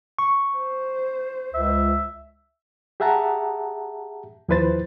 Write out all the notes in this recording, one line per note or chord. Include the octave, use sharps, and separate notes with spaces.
C#6
C5
C#2 E5
G4 G#4 E5 F#5 A5 A#5
D#2 F3 E4 B4 C5 A6